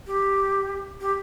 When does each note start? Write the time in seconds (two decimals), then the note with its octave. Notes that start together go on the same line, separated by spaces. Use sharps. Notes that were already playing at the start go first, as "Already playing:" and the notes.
0.07 G4
1.01 G4